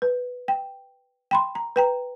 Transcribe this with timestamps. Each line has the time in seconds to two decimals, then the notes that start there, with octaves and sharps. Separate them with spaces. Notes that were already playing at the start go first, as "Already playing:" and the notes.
0.02 B4
0.48 G5
1.31 G5 B5 C6
1.55 A#5
1.76 B4 G5 A#5